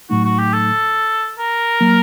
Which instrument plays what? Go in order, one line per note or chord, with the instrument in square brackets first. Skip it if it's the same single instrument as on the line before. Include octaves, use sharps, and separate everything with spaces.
[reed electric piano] A2 F#3 A3 D#4 [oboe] F#4
[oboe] F#4
G4
A4
A#4
[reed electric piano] F#3 A#3